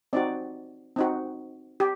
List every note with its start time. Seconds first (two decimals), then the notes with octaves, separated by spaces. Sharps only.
0.13 C4 D#4 F#4 D5
0.96 C4 D#4 F#4
1.80 G4